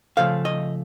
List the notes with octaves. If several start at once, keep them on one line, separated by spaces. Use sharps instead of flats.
C#3 F3 A3 F5
D#5